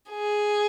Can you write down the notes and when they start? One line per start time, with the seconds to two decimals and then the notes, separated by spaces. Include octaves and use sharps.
0.10 G#4